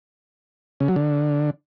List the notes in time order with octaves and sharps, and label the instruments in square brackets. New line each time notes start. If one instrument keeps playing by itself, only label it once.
[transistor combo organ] C#3
F#3
D3